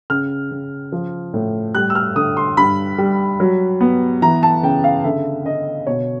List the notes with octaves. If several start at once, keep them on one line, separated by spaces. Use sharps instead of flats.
C#3 F6
C#3
F3
A2
G3 F#6
E6
F6
D3 D#6
C6
G2 B5
G3
F#3
B3
E3 A#5
A5
C#3 G5
F5
D3 E5
D3 D#5
B2 C#5